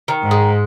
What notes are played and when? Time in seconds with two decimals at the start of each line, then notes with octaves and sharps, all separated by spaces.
0.08 D#3
0.23 G#2
0.31 G#3